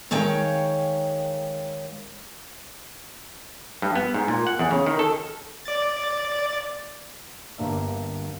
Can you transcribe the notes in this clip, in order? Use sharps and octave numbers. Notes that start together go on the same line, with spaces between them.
D#3 G#3 C#5 F5 G5
G2
B3
G#2
A#2
F#5
E2
C#3
D#3
A4
D5 A6
G1 G2 A#3 D4 E5